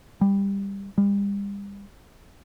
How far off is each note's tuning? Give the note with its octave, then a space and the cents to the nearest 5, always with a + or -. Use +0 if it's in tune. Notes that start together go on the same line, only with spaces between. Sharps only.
G3 +15
G3 +40